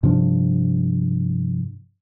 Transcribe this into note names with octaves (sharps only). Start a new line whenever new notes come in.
G2 C3 F3 D4